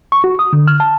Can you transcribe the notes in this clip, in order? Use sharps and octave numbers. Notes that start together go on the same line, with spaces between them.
C#6
F#4
D#6
D3
F6
A5